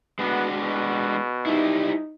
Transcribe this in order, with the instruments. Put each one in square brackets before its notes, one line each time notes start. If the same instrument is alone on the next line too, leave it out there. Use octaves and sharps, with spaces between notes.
[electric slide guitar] G#3 D4 F#4 [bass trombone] B3
[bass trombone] B2
[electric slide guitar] G3 E4 [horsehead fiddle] D#4